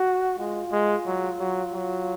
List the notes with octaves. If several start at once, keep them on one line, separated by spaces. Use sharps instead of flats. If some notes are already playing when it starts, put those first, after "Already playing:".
Already playing: F#4
G#3 F4
G#3
F#3
F#3
F#3